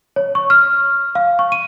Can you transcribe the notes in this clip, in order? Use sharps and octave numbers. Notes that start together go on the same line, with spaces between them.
C#5
C#6
F6
F5
C#6
D#7